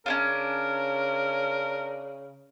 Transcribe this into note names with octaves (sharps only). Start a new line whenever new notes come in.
C#3 C#4 D4 F4 A#4